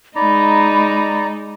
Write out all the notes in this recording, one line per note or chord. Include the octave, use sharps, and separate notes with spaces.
G#3 D#4 D5 A#5 B5